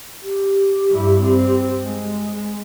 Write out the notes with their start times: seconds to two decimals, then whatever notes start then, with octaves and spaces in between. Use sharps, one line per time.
0.22 G4
0.90 G2 E4
1.21 C4
1.83 G#3